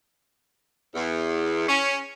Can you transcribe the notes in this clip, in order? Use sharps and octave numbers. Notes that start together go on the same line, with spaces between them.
E2
C#4